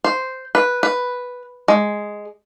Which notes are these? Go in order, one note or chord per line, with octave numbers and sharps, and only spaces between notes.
C5
B4
B4
G#3